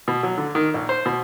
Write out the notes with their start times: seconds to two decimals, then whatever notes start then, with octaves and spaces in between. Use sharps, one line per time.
0.08 B2
0.23 F#3
0.38 D3
0.55 D#3
0.74 A#1
0.89 C5
1.06 B2